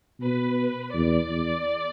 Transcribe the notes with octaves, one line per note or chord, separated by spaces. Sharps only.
B2 B4
E2 D5
E2